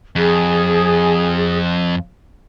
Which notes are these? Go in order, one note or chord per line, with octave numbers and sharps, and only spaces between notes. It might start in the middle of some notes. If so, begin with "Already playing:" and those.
F2 G#4